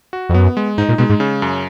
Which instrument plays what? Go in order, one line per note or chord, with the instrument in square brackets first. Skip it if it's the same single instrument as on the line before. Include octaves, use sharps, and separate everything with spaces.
[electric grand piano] F#4
[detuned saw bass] F2
[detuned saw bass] F#2 [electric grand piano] B3
[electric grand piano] G#3
[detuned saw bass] G#2 [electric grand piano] D#4
[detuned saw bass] A#2
[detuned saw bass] B2 [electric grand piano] G#3
[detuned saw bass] G#2
[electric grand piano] C#3
F#2